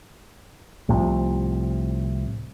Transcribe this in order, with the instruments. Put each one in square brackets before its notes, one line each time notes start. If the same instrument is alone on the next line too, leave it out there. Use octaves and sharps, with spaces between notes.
[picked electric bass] C2 A2 C3 F3